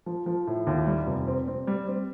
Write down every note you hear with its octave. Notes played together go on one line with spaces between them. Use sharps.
F3
F3
A2
D#2
G3
F1
C4
C4
G3
C4